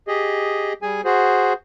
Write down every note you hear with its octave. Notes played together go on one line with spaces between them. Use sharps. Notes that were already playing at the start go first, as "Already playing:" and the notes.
G4 G#4 D#5
G3 G#4 G#5
F#4 G#4 C5